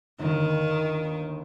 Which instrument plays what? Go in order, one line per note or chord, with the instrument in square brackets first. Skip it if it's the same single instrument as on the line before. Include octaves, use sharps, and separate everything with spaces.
[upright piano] G1 D#2 [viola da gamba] D#3